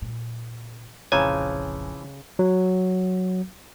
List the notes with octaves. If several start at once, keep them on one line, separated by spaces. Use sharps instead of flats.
A#2
F1 A#1 C#3 E3 F3 C#5 G#5 A#5
F#3